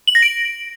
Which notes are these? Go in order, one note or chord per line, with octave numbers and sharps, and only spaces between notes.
F#7
A#6
D7